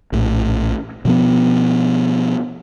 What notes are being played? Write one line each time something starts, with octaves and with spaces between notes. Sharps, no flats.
A#1 A2
B2 F3 B3